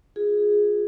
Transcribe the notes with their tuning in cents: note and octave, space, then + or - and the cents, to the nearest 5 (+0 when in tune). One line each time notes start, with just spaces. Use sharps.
F4 +25 G#4 +0